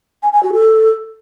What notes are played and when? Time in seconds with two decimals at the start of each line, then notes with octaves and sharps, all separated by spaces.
0.23 G#5
0.33 G#5
0.43 F#4
0.53 A4